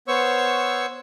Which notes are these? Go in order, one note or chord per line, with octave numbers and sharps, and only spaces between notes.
B3 C5 C#5 C#6 E6